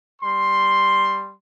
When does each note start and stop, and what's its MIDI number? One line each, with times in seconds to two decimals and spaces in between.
0.22 1.33 55
0.22 1.33 84